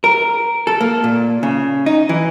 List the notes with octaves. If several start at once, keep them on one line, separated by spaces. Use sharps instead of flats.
A#4
A4
A#3
A#2
C#3
D#4
E3